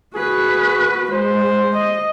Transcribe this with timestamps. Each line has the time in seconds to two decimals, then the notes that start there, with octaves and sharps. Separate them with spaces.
0.15 F#4 G#4 B4
1.12 G#3 C5
1.73 D#5